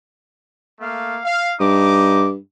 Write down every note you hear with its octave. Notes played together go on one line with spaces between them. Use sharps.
A3 A#3 F5
F5
G2 D#4 D6